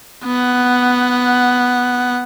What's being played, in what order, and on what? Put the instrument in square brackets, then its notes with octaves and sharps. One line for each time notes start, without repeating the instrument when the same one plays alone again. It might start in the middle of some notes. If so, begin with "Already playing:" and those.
[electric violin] B3 F#5